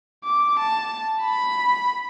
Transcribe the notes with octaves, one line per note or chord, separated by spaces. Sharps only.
D6
A5
B5